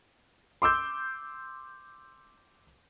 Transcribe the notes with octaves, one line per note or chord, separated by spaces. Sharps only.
C6 D6 E6 G6